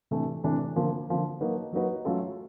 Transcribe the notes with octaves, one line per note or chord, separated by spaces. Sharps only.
C3 E3 A3 D4
C3 E3 A3 D4
D3 F3 A#3
D3 F3 A#3
F#3 A#3 D#4 F#4 B4
F#3 A#3 D#4 F#4 B4
F#3 A3 C#4 F4 A4